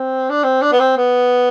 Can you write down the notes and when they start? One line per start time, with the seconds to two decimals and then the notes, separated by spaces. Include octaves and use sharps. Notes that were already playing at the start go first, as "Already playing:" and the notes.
Already playing: C4
0.30 D4
0.44 C4
0.62 D4
0.72 B3
0.80 C4
0.97 B3